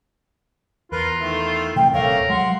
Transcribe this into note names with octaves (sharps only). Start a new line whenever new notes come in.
E2 F4 A#4 B4
D#3 A3 E4
C3 E3 A3 G5
D#1 C3 A3 A#3 C#4 A#4 F5
F#3 G#3 F#5 C6